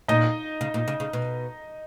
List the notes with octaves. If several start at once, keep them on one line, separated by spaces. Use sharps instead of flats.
A#2 D#4 D#5
C#3
A#2
C#3
C#3
B2